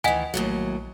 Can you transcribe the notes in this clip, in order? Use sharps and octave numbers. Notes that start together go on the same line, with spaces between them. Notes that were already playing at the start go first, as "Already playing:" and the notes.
D2 D#3 E3 D#5 F#5 G#5
A#1 D#2 A2 F#3